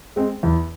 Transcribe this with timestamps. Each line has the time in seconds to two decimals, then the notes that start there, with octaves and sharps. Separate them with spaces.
0.16 G#3 C4
0.43 E2